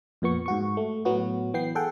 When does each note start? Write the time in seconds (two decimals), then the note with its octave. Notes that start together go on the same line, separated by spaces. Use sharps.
0.22 F2 A#2 B3 C#6
0.46 G#2 F#4 C#6
0.77 A3
1.05 A2 F#3 B3 F#4
1.54 E3 B3 G5 C7
1.75 G#4 A4 F#5 G5